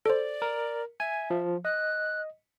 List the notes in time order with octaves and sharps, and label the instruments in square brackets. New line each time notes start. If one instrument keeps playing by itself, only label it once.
[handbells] A4 C5 [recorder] D5
[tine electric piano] A#4
[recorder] E5 [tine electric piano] G#5
[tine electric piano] F3
[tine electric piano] D#5 [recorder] F#6